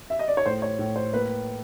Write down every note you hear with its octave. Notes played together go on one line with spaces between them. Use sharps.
E5
D#5
D5
C#5
A2 C5
C#5
A2
C5
A#3 B4